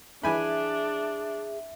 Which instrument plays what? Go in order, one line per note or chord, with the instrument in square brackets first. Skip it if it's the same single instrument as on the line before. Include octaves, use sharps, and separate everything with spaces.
[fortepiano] E3 G#5 B5 [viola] D4 [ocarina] G#4 [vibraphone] E5